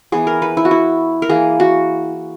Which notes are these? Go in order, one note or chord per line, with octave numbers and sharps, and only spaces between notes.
E3 B3 G#4
A#4
B4
E4
F#4
E4
A#4
E3 A#3 G#4
F#4